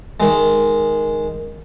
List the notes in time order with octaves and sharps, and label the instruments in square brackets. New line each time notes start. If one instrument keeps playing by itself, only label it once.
[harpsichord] D#3 G#3